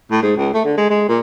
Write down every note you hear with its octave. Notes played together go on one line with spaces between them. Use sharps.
A2
G#2
C#2
A3
D3
G#3
G#3
A#2